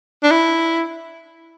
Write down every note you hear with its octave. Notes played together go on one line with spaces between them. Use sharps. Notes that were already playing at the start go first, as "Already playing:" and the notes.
D4
E4